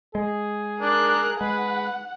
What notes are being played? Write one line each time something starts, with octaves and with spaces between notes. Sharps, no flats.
G#3 G#4
D4 A#4 F#6
G#3 B4 F#5